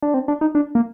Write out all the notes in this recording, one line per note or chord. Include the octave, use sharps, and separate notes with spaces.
D4
C4
D4
D#4
D4
A#3